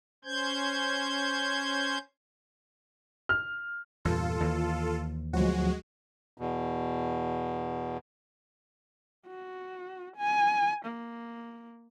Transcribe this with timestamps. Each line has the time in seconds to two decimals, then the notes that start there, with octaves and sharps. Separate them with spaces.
0.24 C#4 C5 G6 G#6
3.29 F6
4.05 E2 G2 A#2 F4 A4
4.40 D#2 E3
5.33 D2 F3 F#3 G#3 F#4
6.38 E2 B2
9.27 F#4
10.17 G#5
10.86 A#3